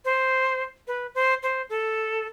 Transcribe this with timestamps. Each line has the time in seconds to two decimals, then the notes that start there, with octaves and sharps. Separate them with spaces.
0.05 C5
0.88 B4
1.15 C5
1.43 C5
1.70 A4